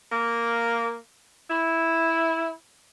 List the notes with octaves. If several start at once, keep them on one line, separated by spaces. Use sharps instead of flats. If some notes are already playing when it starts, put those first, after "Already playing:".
A#3
E4